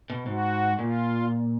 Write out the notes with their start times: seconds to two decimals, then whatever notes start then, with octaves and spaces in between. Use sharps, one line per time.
0.10 B2
0.26 G#2 F#4
0.79 A#2 F4